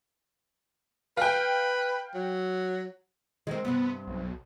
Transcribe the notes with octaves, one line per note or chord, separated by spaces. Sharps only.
B4 F5 G5
F#3
D#3 G#3 C4
G2 C3 B3
B1